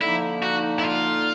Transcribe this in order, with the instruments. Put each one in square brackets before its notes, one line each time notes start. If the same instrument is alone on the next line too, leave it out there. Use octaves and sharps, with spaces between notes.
[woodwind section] D3 F3 A#3 D#4 [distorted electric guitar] E4
[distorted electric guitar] F#4
E4
F4